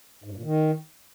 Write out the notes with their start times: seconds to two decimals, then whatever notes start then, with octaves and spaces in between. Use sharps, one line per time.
0.24 G#2
0.30 G2
0.37 A#2
0.43 D#3